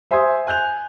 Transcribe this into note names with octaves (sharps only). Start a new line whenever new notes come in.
C5 E5 G#5 C6 D#6 G#6
G#5 F#6 G6 F7